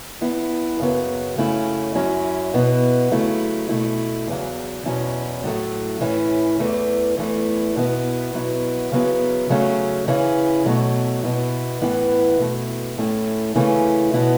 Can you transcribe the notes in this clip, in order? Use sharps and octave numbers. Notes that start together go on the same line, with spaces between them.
E2 E3 B3 E4
F#2 C#3 F#3 B3
F#2 C#3 A3 C#4 E4
F#2 F#3 C#4 E4
B2 B3 E4
C#3 F#3 A3 E4
B2 A3 E4
E2 C#3 F#3
E2 B2 F#3 C#4 E4
A2 F#3 A3
A2 E3 C#4 E4
E2 E3 A3
E2 E3 A3 E4
B2 B3 E4
B2 F#3 B3 E4
C#3 F#3 B3 E4
C#3 F#3 A3 C#4
C#3 E3 C#4 E4
B2 F#3 A3
B2 B3 E4
A2 E3 B3 E4
B2 A3 E4
A2 A3 C#4 E4
C#3 E3 A3 C#4 E4
B2 B3 E4